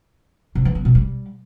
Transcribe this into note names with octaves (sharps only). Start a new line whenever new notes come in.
C3
E3
B3
B2
G3